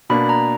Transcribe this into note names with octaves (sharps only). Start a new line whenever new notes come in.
B2 A#3 D4 B5
A#5